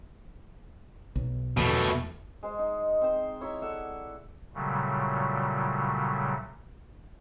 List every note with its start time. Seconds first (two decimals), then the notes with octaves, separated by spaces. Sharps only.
1.15 B1
1.57 E2 B2 A3
2.43 G#3 C5
2.59 D#4
3.01 C4 C5
3.40 E4 C#5 E5 A#5
3.62 A4 D5 E5 F#5
4.55 A#2 C#3 F#3 G3 A3